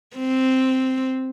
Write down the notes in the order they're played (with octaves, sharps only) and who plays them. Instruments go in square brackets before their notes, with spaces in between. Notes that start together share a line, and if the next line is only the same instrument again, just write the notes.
[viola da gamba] C4